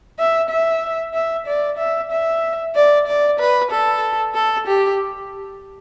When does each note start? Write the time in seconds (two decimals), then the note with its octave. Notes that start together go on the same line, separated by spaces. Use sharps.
0.19 E5
0.49 E5
1.14 E5
1.47 D5
1.78 E5
2.11 E5
2.75 D5
3.07 D5
3.39 B4
3.70 A4
4.35 A4
4.67 G4